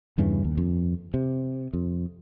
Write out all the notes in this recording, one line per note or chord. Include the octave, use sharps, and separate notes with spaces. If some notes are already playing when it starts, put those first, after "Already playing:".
E2 G2 C#3 E3
D#2
F2
C3
F2